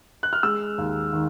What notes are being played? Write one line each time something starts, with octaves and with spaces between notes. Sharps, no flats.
F#6
F6
G#3 E6
D#2
D#3